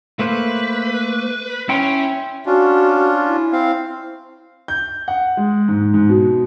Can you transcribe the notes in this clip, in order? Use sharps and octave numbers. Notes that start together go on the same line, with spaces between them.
A3 A#3 B4 C5
C#4 E4 G5 C6
C#4 D4 F4 F#4
E4
C4 F5
G6
F#5
G#3
G#2
G#2
B2